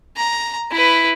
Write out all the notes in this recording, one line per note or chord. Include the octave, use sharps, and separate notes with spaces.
A#5
E4 B4